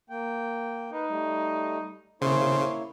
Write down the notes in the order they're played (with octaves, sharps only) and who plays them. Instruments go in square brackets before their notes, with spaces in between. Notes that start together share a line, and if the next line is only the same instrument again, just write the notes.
[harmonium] A#3 G5
[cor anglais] D#4 [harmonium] B4
[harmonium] G3 A3
[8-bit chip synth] C#3 [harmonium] A#3 E4 C#5 [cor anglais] C5